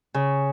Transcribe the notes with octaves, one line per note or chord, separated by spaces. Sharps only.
C#3